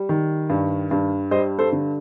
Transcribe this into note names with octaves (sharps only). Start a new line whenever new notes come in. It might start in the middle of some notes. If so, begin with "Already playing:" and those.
Already playing: G3
D#3
G2
G2
G3 C5 D#5
A4 C5
D3